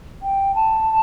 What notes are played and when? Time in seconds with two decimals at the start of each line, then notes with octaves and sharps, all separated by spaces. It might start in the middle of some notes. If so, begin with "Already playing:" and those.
0.22 G5
0.55 A5